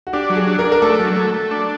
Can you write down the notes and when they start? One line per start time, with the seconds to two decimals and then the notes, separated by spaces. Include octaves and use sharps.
0.07 F#4
0.13 D4 G4
0.30 F#3
0.36 G#4
0.48 D4
0.59 A#4
0.65 D4
0.72 A#4
0.82 A3 A4
0.99 F#3
1.16 A3
1.34 A3
1.51 D4